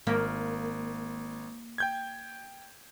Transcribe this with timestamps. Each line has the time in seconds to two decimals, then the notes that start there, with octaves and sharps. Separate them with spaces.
0.07 G#1 A#3
1.78 G5 G6 G#6